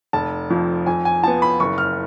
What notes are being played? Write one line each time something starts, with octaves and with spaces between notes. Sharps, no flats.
F1 A5
F2 F3
F2 G#5
G#5
F3 B3 A5
B5
F#1 C#6
F6